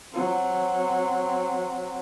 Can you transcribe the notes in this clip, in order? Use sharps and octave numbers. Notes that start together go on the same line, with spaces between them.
F#3 C4